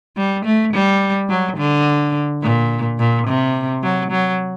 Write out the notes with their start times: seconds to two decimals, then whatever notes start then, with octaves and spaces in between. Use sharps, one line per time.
0.17 G3
0.45 A3
0.74 G3
1.29 F#3
1.57 D3
2.43 A#2
2.99 A#2
3.28 C3
3.83 F#3
4.11 F#3